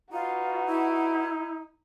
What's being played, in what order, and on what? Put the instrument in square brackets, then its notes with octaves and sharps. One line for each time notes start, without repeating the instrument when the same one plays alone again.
[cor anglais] D#4 [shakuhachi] F4 [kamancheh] F#4 B4
[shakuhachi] E4